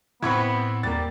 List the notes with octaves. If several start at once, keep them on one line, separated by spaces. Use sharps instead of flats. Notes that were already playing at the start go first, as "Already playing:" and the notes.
A2 B3 C4 E4 B5 C#6 G#6
D#2 G3 A#3 A6